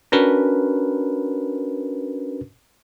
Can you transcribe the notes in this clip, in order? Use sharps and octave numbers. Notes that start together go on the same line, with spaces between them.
C#4 D4 F#4 A#4 B4